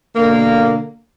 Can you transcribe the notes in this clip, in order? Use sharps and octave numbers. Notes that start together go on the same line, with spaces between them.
B2 D3 A#3